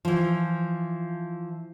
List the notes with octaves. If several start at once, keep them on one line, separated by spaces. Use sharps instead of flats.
E3 F3